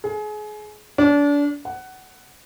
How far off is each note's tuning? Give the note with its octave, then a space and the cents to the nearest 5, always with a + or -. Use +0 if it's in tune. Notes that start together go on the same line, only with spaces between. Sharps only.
G#4 +30
D4 -30
F#5 +15